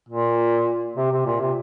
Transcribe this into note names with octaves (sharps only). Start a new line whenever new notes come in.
A#2
C3
C3
A#2
C3